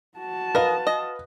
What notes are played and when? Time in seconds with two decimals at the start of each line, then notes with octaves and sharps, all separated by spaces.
0.18 F#4 A5
0.55 A#4 B4 D#5 F5
0.87 D#5